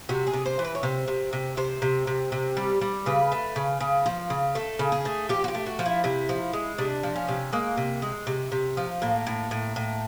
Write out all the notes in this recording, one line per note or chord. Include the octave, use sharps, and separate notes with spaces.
C3 F#4
G#4
C3
C5
E3
B4
C#5
C3 C5
C3
C3
C3 C5
C3
C3
C3
G3
G3
C#3 B4
A3
C#3
C#3
F3
C#3
A3 A4
C#3
G#4
A3
F3 G4
F#4
G4
A3
F#4
F3
E4
C3 E4
F3
G#3
C3 D4
F3
C#4
C3
G#3 A#3
C3
G#3
C3
C3
F3
A2 A#3
A2
A2
A2